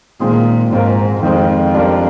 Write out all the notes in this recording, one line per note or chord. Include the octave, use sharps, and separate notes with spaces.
A#2 D#3 G#3 C4 F4 G#4
G#2 F3 C4 F4 A#4
F2 D#3 G#3 C4
G3 D4 F4 A#4